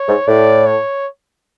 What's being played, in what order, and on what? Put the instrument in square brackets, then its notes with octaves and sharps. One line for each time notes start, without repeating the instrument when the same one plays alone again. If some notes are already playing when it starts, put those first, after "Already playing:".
Already playing: [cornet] C#5
[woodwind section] G#2
[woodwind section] A2 [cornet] D5
[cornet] C#5